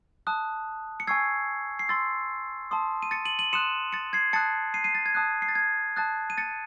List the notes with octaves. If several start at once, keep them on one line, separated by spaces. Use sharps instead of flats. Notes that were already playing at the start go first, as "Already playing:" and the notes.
A5 D#6 F#6
C#7
G#5 C#6 E6 G#6 C7
C7
C6 E6 A6
A5 C6 D#6
D#7
A6 C#7
D#7 F#7
D#7 F#7
C6 D#6 F#6 C#7 E7
A6 C#7
G#6 C7
A5 D#6 F#6 A6 C#7
C7 D#7
C7 D#7
A6
G#6
A5 D#6 F#6
C7
A6
G#6
A5 D#6 F#6 A6
D#7
A6 C#7